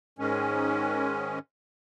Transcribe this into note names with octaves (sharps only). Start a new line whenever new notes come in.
G#2 D#3 G#3 C#4